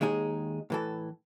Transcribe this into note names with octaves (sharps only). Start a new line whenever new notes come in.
D#2 G#3 D#4 G#4
A2 E3 A4